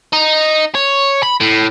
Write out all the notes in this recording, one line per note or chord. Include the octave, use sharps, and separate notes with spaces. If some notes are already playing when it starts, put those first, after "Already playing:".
D#4
C#5
B5
A2